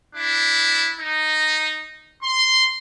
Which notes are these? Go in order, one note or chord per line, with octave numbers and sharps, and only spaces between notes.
D4 E4
D#4
C6